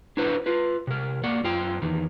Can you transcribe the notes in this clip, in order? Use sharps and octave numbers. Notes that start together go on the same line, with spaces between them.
D4 E4 F#4 B4 C5
F4 B4
C3 A#4
A#3 F#4 D5 F#5
F#2 F4 G5
E2 D#3